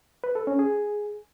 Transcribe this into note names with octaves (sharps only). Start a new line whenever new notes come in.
B4
A4
C#4
G#4